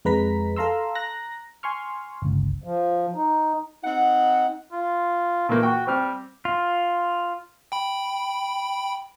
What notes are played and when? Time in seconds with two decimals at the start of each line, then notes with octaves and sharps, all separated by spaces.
0.05 F2 G#3 B4 A#5 B6
0.56 A4 F5 A#5 C6 E6
0.95 A#5 F#6 A#6
1.63 G#5 C6 C#6 F6
2.22 G1 C#2
2.64 F3
3.15 D#4
3.84 C4 D#4 F#5
4.72 F4
5.49 A#2 E3 A3 A#3
5.63 F#4 G5 C#6
5.87 G3 C4 F6
6.45 F4
7.72 G5 B5